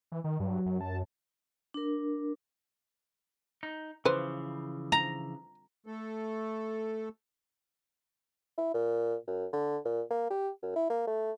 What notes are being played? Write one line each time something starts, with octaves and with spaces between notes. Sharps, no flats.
E3
D#3
G2 F#3
F#2
A5
D4 A#4
D#4
C#3 E3 F3 B4 C5
A#5
A3 A4
E4
A#2
F#2
D3
A#2
A#3
G4
F#2
E4
A#3
A3